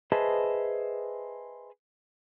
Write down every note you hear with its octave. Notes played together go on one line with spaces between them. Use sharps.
G#4 B4 C5 D#5 E5 A5